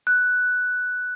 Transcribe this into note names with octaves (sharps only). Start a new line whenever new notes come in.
F#6